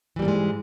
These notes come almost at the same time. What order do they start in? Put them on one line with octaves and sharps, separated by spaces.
E3 G3 A#3 G#2 G#3